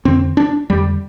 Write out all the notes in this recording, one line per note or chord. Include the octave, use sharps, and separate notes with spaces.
F2 D3 C4
D4
F2 D3 G3